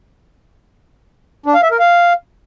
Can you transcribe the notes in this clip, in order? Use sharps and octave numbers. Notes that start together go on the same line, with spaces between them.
D4
F5
E5
A#4
F5